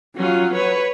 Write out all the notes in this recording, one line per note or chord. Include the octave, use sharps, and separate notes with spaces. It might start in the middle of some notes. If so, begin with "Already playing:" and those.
F#3 C#4 F4
B4 C#5